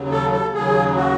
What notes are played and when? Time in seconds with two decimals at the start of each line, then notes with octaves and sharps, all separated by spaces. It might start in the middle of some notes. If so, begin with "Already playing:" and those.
Already playing: D#2 C#3 F#3
0.11 A4
0.32 A4
0.54 D#2 C#3 F#3 G#4
0.97 F#4